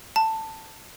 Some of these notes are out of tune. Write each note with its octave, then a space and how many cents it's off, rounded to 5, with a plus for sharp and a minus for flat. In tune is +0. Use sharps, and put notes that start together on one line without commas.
A5 +15